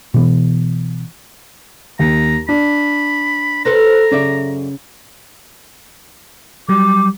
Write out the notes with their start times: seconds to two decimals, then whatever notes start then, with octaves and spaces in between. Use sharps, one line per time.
0.14 B2 E3 B3
1.99 D#2 A#5
2.49 D4 B5
3.65 A4 B4 C5 A#5
4.11 F#2 C#3 D5 E5
6.69 F#3 G3 D6